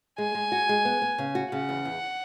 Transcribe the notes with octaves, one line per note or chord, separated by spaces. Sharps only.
G#3 G#5
G#3
F#4
G#3
B3
B3
C#3
F#4
C#3 F#5
E2
E2